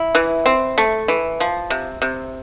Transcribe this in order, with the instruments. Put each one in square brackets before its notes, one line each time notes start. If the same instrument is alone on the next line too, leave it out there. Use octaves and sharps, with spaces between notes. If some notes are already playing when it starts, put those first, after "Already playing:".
Already playing: [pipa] E4
E3
C4
A3
E3
F3
C3
C3